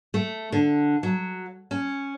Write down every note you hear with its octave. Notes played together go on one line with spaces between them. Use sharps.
A3
D3
F#3
C#4